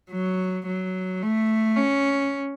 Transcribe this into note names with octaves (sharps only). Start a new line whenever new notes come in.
F#3
F#3
A3
C#4